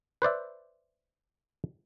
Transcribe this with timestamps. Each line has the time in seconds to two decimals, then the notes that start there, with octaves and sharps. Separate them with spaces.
0.22 B4 C5 D5 E5